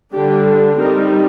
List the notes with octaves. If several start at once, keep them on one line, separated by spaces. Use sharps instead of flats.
D3 G3 D4 G4
G3 C4 D#4 A#4